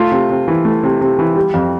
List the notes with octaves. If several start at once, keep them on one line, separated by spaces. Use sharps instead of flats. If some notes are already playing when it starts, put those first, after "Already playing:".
Already playing: A3 F4
C3
C3
E3
A3
C3
C3
E3
G3
F2